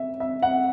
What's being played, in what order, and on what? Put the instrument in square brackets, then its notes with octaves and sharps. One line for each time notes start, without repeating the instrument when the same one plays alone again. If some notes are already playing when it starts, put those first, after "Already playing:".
Already playing: [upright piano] E5
E5
F#5